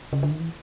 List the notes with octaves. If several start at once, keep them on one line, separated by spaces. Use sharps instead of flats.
C#3
D3
D#3
E3